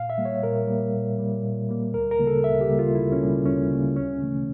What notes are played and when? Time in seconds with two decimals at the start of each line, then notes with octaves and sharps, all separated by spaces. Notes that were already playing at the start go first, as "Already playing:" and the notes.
Already playing: A#2 F5
0.10 E5
0.18 G3 A#3
0.25 C#5
0.43 A#2 A#4
0.67 G3 A#3
0.94 A#2
1.18 G3 A#3
1.43 A#2
1.69 G3 A#3
1.94 D2 A#4
2.11 A#4
2.19 C#3 G3 A#3
2.27 A4
2.44 D2 E5
2.61 G4
2.70 C#3 G3 A#3
2.79 F4
2.95 D2 E4
3.12 C#4
3.21 C#3 G3 A#3
3.45 D2 C#4
3.71 C#3 G3 A#3
3.96 D2 C#4
4.21 C#3 E3 A3